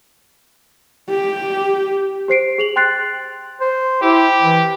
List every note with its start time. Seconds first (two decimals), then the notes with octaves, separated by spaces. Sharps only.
1.09 G4
2.28 G4 C5 C7 D7
2.58 G#4 F7 F#7
2.76 G5 C6 F#6 A6 C7
3.61 C5
4.02 E4 G4
4.42 E3